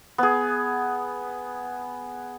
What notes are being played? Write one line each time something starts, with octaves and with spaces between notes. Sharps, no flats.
B3 G#4